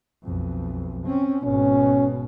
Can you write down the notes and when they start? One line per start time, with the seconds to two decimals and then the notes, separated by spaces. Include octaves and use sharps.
0.24 B1 F2
1.06 C4 C#4
1.44 G#1 B2 C#4